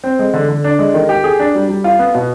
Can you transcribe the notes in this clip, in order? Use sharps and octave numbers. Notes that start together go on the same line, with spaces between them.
C4
G#3
D3
D3
D4
G#3
D#3
G4
G#4
D4
G3
G3
F4
B3
B2